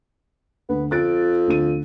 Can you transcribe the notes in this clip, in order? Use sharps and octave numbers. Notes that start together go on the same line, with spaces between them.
D2 B3
F2 F#6 A6 D7
D2 D#7